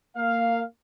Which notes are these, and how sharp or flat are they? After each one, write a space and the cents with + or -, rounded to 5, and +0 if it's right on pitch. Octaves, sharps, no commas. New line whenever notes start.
A#3 -20 F5 +0